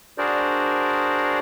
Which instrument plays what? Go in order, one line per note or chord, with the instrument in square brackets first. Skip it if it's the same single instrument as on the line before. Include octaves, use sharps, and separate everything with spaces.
[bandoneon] D4 F#4 G#4 A#4 C5 D5